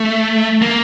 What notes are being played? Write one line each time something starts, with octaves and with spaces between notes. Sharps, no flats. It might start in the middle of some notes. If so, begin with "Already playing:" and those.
Already playing: A3
A#3